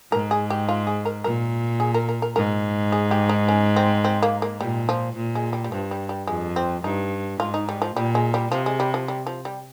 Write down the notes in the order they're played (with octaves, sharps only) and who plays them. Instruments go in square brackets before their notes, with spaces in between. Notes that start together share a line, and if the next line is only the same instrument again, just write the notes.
[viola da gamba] G#2 [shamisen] A#4
[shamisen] G#4
G4
F4
G#4
A#4
[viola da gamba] A#2 [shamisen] A#4
[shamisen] G#4
A#4
A#4
A#4
[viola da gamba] G#2 [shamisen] A#4
[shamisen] G#4
G4
D#4
C#4
C4
C4
A#3
A#3
[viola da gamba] A#2 [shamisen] G3
[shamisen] F3
[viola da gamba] A#2
[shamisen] G#3
G3
G3
[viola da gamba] G2 [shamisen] F3
[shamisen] G3
G3
[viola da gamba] F2 [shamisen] G#3
[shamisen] C4
[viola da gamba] G2 [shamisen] D#4
[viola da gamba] G#2 [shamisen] F4
[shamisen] D#4
G3
F3
[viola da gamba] A#2 [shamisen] G3
[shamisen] G#3
G3
[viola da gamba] C3 [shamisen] F3
[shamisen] G#3
G3
F3
G3
F3
G3